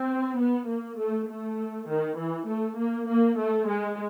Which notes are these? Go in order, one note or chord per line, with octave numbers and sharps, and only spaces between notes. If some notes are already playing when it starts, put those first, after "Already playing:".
Already playing: C4
B3
A#3
A3
A3
D#3
E3
A3
A#3
A#3
A3
G#3